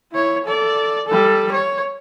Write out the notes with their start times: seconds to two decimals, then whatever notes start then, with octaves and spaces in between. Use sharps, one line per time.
0.12 E4 C#5
0.45 A4 D5
1.07 G3 A4
1.52 C#5